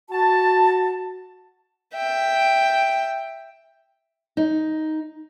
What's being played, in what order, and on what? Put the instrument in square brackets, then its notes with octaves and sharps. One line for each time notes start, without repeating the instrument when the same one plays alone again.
[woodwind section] F#4 A5
[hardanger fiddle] E5 G5
[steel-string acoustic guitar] D#4